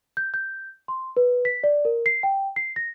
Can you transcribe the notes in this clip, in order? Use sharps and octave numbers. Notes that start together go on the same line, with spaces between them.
G6
G6
C6
B4
B6
D5
A#4
C7
G5
C7
A#6